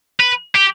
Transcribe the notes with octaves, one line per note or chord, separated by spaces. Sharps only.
B4
G4